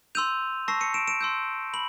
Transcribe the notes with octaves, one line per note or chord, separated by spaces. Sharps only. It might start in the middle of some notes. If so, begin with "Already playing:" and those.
C6 E6 G6 D#7 F7
A5 C#6 E6 A#6 C7
C#7 D#7
D7 E7
D7 E7
C6 E6 G6
B5 F#7